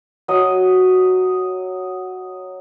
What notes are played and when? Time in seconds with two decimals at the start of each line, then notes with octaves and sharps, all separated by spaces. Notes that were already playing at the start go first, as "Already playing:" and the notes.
0.28 F#3 D#5